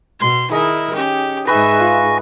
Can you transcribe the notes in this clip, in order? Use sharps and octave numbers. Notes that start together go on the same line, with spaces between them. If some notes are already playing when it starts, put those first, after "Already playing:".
B2 C6
D#3 D#4 E4 G#4 A#4 D#5
C#4 G4
G#2 D#4 G#4 B4 E5 G#5 C#6 A#6
F4